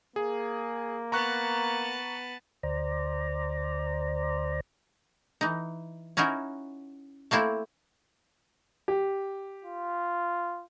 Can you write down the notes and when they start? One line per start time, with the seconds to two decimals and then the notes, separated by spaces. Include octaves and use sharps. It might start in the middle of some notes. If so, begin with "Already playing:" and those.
0.16 A#3 G#4
1.12 B3 A5 A#5 C#6 F#6
2.63 D2 C5 D5 A#5
5.41 E3 D#4
6.17 C#4 D#4 E4 F#4 A#4
7.31 A3 A#3 C4 E4 A4
8.88 G4
9.64 F4